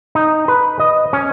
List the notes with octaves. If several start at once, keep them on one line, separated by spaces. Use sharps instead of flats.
D#4
B4
D#5
C#4